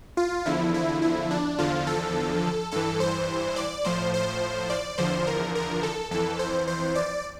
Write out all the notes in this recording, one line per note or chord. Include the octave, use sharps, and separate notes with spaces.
F4
E2 D3 F3 E4
E4
E4
D4
E2 D3 F3 F4
A4
G2 E3 A4
C5
D5
A2 F3 C5
C5
D5
E2 D3 F3 C5
A#4
A#4
A4
F2 E3 A4
C5
C5
D5